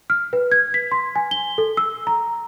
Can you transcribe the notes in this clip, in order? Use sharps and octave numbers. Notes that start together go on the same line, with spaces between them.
F6
B4
G#6
B6
C6
G#5
G7
A4
E6
A#5